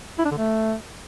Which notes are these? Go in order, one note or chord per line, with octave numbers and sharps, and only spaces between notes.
E4
D4
D3
A3